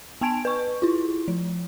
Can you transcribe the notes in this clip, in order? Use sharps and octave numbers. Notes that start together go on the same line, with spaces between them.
B3 G#5 A5 G#6 D7
B4 C#6
E4 F4
F3